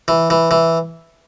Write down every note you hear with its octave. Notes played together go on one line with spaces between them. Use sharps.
E3
E3
E3